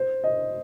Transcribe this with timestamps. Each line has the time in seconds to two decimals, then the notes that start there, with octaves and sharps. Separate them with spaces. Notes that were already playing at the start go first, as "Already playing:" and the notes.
Already playing: C5
0.24 D#5